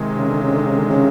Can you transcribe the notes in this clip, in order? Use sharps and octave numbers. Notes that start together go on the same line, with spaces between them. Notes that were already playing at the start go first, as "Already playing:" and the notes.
Already playing: C3 D#3 G#3
C#3
D3
C#3
D3
C#3
D3
C#3